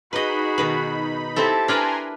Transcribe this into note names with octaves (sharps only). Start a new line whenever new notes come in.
D#4 F#4 G#4 B4 D#5 B5
B2 D#3 B4
C4 E4 G4 A4 A5
D4 A#4 B4 G#5 A#5 C6